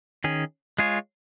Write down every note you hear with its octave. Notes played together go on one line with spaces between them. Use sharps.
D#3 C#4 G#4
G#3 F4 G#4 C#5